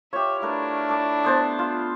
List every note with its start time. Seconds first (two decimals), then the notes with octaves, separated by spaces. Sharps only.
0.13 F4 G4 C#5 E5
0.42 A3 D4 E4 A#4 B4
0.89 A4 B4 D6
1.24 B3 C5 A5
1.59 F4 B5